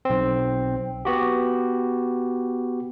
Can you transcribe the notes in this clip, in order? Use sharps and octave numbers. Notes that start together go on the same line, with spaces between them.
B1 C4
B3 F#4 G4